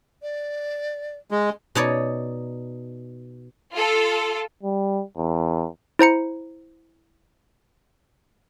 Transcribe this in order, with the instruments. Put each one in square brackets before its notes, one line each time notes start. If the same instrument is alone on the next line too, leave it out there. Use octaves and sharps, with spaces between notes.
[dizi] D5
[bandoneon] G#3 [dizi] D#5
[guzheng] B2 D#4 C#5 D5
[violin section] F4 A4
[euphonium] G3
E2
[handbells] E4 C5 A#5 C#7